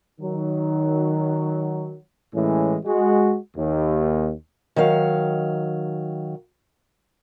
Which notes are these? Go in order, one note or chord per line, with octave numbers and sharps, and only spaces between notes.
D#3 F#3
A2 E3 G#3 C#4
G#3 F#4
D#2
D#3 F#3 F5